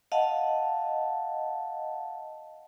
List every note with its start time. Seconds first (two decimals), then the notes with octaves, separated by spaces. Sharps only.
0.12 D#5 F5 F#5 A5